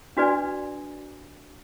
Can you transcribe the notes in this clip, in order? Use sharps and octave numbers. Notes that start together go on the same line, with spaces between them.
D4 F#4 B4 D5 G#5